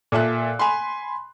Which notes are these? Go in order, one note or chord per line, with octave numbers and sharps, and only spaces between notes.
A#2 A4 E5 F#6
G#5 B5 C6